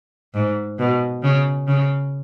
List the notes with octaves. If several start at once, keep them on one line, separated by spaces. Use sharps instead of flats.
G#2
B2
C#3
C#3